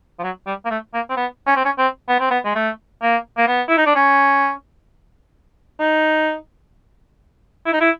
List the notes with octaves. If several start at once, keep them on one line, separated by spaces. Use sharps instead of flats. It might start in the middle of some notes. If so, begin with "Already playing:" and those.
F3
F#3
G3
A#3
A3
A#3
C4
B3
C#4
C4
C#4
C4
B3
C4
B3
G#3
A3
A#3
A#3
B3
E4
D#4
D4
C#4
D#4
E4
D#4
E4